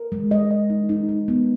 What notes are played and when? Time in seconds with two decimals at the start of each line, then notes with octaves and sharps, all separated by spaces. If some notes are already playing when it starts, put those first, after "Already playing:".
Already playing: A#4
0.12 G#3
0.31 D#5
0.51 D#5
0.70 D#4
0.89 D#4
1.09 D#4
1.28 B3